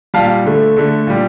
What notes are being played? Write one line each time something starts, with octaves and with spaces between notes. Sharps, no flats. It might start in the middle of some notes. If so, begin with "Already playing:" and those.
A#2 G3 F5 A5
D3 A3
D3 A3
A#2 G3